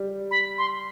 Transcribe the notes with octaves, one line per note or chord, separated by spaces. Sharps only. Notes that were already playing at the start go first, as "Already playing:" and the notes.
Already playing: G3
B5
C6